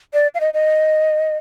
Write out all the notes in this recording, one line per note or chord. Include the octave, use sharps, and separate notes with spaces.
D5
F5
D#5
D#5